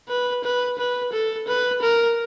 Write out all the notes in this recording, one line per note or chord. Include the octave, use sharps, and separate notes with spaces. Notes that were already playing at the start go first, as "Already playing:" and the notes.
B4
B4
B4
A4
B4
A#4